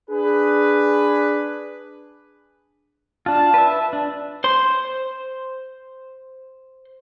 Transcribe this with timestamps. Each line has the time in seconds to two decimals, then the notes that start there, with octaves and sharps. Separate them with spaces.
0.10 D4 G#4 B4
3.26 D4 F4 A5
3.54 B4 E5
3.93 D4
4.44 C5 C6